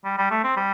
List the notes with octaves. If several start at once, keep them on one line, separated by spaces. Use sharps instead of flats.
G3
G3
A3
C4
G3